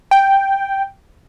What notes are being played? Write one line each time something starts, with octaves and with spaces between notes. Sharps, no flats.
G5